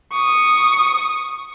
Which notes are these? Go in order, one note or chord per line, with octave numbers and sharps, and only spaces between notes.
C#6 D#6